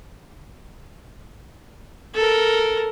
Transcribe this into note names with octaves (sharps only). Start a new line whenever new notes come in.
A4 A#4